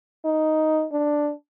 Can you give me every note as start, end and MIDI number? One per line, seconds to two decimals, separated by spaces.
0.25 0.86 63
0.92 1.32 62